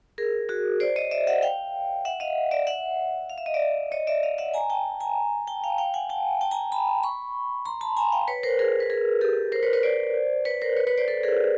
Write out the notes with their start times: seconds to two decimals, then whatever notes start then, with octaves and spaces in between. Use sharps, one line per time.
0.18 G#4 A#4
0.49 F#4 G#4
0.80 C5 D5
0.96 C#5 D#5
1.11 D5 E5
1.27 E5 F#5
1.42 F5 G5
2.05 E5 F#5
2.20 D#5 F5
2.51 D5 E5
2.67 E5 F#5
3.29 F5
3.38 E5
3.46 D#5
3.54 D5 E5
3.92 C#5 D#5
4.07 D5 E5
4.23 D#5 F5
4.38 E5 F#5
4.54 G#5 A#5
4.70 G5 A5
5.00 G#5 A#5
5.47 G5 A5
5.64 F5 G5
5.78 F5 G5
5.94 F#5 G#5
6.09 G5 A5
6.41 G5 A5
6.51 G#5 A#5
6.72 A5 B5
7.03 B5 C#6
7.66 A#5 C6
7.81 A5 B5
7.97 G#5 A#5
8.12 F5 G5
8.28 B4 C#5
8.43 A#4 C5
8.59 G#4 A#4
8.80 B4
8.90 G#4 A#4
9.21 G4 A4
9.52 A#4 C5
9.63 B4 C#5
9.73 B4 C#5
9.83 C5 D5
10.45 B4 C#5
10.62 A#4 C5
10.77 B4 C#5
10.87 B4 C#5
10.98 C5 D5
11.08 A4 B4
11.23 G#4 A#4